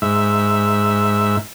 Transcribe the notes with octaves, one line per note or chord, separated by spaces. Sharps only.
G#2 E5